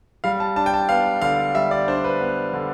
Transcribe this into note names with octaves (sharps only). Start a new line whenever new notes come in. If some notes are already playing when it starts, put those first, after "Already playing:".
G3 F5
A5
D4 A5
G5
A5
B3 F5
D3 F5
G3 E5
D5
D4 C5
B4
B3
D3